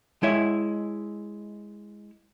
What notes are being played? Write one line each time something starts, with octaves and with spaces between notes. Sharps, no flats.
G#3 E4 C#5 E5